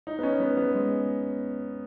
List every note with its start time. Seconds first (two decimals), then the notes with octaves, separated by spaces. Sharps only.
0.07 D#4
0.19 B3
0.23 C#4
0.40 B3
0.57 B3
0.75 G#3